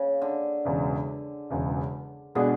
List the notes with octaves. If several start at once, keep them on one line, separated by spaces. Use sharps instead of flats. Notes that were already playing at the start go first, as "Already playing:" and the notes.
Already playing: C#3
D3
E1 E2 C#3
E1 E2 C#3
B2 D3 G#3 B3 D4 G#4